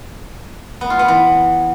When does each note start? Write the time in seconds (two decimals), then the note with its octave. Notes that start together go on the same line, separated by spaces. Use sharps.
0.81 B3
0.90 F4
0.99 B3
1.08 E3